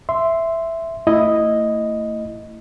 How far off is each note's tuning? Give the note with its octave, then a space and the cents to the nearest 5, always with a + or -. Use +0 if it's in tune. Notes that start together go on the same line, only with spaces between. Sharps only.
E5 +5 C6 -5
A3 +35 E4 +0 D#5 +0